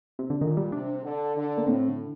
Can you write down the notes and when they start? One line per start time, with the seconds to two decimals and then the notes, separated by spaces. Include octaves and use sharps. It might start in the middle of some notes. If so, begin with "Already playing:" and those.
0.19 C3
0.30 D3
0.41 A#2 D#3
0.57 G3
0.72 C3 D4
1.04 D3
1.36 D3
1.58 A#3
1.67 A2 C4
1.88 D3